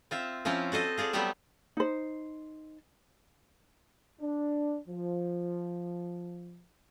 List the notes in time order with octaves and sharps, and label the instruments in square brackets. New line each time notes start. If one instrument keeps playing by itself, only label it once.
[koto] C4 F4 E5
F3 C4 C#4 E4 F4
F#4 A4 C5 D#5
F4 G#4 A4 D5
F#3 G3 A3 B3 G4 E5
[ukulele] D#4 C5
[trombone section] D4
F3